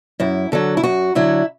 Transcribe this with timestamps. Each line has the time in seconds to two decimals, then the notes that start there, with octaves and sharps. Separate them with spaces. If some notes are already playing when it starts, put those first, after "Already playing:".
0.20 F#2 E4
0.52 D3 F#3 A4
0.77 E4
0.83 F#2 F#4
1.15 D3 F#3 E4